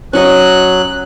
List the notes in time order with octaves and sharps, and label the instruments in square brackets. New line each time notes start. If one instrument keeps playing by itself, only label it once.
[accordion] F#3 F#6 [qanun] C#4 F#4 D#5